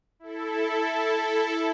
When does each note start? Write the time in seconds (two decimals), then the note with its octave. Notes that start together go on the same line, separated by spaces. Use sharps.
0.20 E4 A4